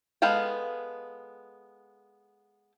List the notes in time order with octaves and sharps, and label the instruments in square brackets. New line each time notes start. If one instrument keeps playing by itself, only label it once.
[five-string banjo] G#3 B3 A4 F5 G5